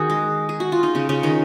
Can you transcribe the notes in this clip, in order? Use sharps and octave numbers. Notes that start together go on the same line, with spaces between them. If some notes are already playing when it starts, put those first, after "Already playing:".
Already playing: D#3 D#4 F#4 G#4
G#3
G#4
F#4
F4
D#4
C#3 C#4
C#3 C#4
D#3 D#4